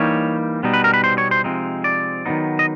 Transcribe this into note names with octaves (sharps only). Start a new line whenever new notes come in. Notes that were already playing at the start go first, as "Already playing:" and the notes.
Already playing: E3 G3 A#3 D#4 C#5
B2 G3 B3 D#4
B4
A#4
B4
C5
C#5
C5
C3 F3 G#3 C4 D#4
D5
D#3 F#3 B3 D#4
D#5